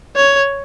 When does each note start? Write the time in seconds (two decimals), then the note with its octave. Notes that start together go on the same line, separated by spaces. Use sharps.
0.16 C#5